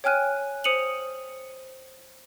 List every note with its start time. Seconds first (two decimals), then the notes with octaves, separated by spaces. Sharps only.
0.04 C#5 G5 G#5 F6 F#6 D#7
0.64 C5 D#6 C#7 D#7 F7 F#7